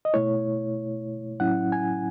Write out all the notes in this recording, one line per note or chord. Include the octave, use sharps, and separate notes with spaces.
D#5
B2 A3 E4 C#5
A2 F#3 C#4 E4 F#5
G#5